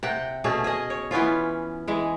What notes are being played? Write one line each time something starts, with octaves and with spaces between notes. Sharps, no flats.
C3 F#5 G5
B2 A3 C#4 G#4
G#4 D#5
C#5
E3 B3 C#4 F4
E3 G#3